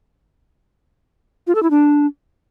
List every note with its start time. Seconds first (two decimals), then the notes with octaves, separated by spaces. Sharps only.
1.47 F4
1.55 A4
1.63 E4
1.71 D4